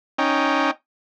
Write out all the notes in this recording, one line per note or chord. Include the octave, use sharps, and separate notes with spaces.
C#4 D#4 G5